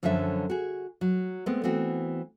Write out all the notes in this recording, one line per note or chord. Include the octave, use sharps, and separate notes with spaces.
F#2 D3 F3 F#3 C#5 E5
F#4 G#4
F#3
G#3 A3 B3 C4
E3 B3 C4 F#4